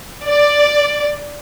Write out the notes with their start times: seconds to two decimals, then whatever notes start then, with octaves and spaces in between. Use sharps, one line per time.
0.24 D5